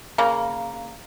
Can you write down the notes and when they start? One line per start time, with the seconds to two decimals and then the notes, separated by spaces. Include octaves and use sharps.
0.18 C#3 A#3